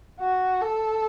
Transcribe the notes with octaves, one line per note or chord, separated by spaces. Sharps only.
F#4
A4